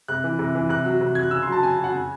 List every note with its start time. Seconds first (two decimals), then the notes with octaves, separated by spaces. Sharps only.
0.08 C3 F#6
0.24 E3
0.39 C3
0.55 E3
0.69 C3 F#6
0.85 F#3
1.01 C3
1.15 F#3 G#6
1.23 F#6
1.31 C#3 E6
1.42 C6
1.48 F#3 A5
1.62 C#3 G#5
1.79 F#3
1.84 F#5
1.93 C#3 G#5